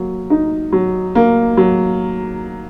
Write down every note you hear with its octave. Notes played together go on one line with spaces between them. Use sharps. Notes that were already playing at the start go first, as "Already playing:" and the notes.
Already playing: F#3 A#3
D#4
F#3
A#3
F#3